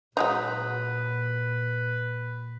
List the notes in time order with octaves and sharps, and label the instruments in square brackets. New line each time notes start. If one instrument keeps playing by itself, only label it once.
[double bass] A#2 [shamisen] F#3 G#3 D#4 [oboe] B4